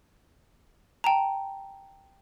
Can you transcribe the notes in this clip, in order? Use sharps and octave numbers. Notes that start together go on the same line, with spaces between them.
G5 A5 A#5